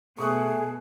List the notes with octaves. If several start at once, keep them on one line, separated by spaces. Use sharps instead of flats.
B2 A3 G#4 C#6 D#6 F#6